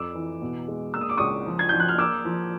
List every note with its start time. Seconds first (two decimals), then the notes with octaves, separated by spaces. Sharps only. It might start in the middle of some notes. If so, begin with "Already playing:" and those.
Already playing: F2 D6 E6
0.15 E3
0.42 B2
0.68 G#3
0.94 A#3 E6
1.01 D#6
1.09 D6
1.17 C#2 C#6 D#6
1.46 F3
1.59 G#6
1.69 F3 G6
1.80 F#6
1.88 F6
1.98 A#3 D6 E6
2.25 F3